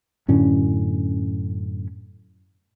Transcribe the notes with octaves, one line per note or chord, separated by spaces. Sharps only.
F#2 A2 D3 C#4